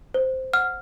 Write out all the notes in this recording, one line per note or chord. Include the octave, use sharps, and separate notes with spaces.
C5
F#5 F6